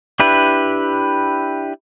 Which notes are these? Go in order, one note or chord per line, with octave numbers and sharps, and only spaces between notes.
D4 E4 G4 B4